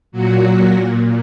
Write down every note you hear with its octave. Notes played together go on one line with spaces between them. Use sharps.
A#2 F#3 F#4